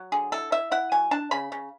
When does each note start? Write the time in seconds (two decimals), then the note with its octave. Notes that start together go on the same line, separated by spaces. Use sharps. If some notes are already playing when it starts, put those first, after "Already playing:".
Already playing: F#3
0.12 D3 G#4
0.32 E4 A4
0.52 E4 E5
0.71 E4 F#5
0.92 F#3 G#5
1.11 D4 A5
1.31 C#3 B5
1.52 C#3